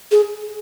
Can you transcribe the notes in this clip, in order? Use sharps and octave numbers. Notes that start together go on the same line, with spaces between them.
G#4